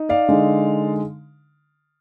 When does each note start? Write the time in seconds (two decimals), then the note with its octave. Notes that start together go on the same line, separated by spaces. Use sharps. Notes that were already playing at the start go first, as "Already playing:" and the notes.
Already playing: D#4
0.09 D5 F5
0.28 D3 G#3 D#4